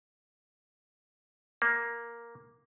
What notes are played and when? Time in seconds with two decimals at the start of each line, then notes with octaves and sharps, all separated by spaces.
1.62 A#3